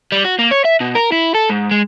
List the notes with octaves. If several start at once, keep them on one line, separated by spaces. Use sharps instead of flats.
G3
F#4
A#3
C#5
E5
B2
A#4
E4
A4
G#2
G#3